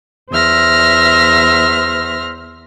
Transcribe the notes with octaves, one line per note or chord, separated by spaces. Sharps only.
E2 C5 E5 F6 A#6